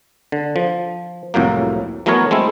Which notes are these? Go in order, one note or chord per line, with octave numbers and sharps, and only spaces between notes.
D3
F3
C2 F2 A2 F#3 A#3
E3 F#3 A3 B3 A#4 C#5
G#3 A3 C4 E4